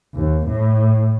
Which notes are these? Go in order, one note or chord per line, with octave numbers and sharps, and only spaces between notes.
D#2
A2